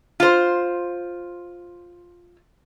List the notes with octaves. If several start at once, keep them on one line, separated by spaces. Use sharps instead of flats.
F4 C5